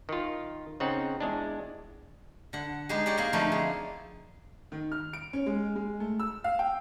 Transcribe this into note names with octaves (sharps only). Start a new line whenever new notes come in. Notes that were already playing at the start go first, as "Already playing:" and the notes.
D#3 F4
C#3 C4 D#4 F#5
E2 G#3 D4
D3 F#5
G#3 B3 D#4 G4 G#4
G4 G#4 C#5 D5 F#5 G5
A#3 C4 G4 A#4 F5 G#5
D3 E3 F3 A3 A#3 D#4
G#4
D#3
F6
D7
C#4
G#3
G#3
A3
E6
F5
G5